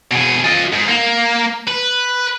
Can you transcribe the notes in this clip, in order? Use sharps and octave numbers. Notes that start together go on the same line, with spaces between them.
B2 G#4
F4 D#5
G#2
A#3
B4